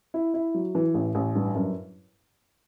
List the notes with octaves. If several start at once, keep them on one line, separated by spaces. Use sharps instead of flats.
E4
E4
F#3
E3
A1
A1
G2
F#2